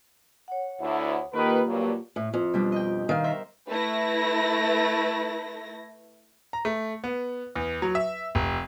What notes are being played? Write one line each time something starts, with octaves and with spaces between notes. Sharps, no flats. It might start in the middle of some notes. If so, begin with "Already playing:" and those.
C#5 F#5
D2 E4
D#3 A#3 F4 G4 B4
G2 A#2 F#3
A2
F2
B2 G3 D4
D#5 G5
D#3 F5
A#4 C5 E5
A3 E4 B4 A#6
A#5
A3
B3
E2
F#3
E5
F1